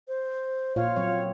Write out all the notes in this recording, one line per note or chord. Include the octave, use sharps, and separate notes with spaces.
C5
A#2 F4 C#5 F5
F#3 C4 C#5